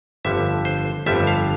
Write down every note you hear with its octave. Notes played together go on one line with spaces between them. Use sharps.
G1 F2 D3 G3 E5
C5
G1 F2 D3 G3 E5
F5